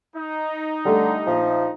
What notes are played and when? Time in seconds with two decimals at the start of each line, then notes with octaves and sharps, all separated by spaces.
0.16 D#4
0.85 D3 G3 A3
1.27 A#1 F3